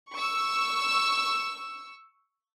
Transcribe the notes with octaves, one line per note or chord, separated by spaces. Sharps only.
C#6 E6